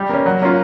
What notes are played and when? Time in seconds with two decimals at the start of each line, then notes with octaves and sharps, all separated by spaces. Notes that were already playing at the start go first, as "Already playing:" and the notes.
Already playing: G3
0.09 A#3 C#4
0.26 F#3
0.42 A#3 C#4 F4